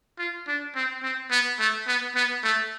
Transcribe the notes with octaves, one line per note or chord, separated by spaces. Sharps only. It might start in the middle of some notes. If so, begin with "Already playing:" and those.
F4
D4
C4
C4
B3
A3
B3
B3
A3